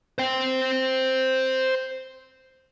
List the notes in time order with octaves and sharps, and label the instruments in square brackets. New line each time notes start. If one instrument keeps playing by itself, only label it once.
[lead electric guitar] C5 G5